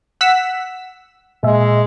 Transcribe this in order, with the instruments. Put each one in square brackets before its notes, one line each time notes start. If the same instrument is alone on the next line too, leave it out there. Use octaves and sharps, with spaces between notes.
[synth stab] F#5 E6 B6
[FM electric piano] A#2 E5 [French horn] G#3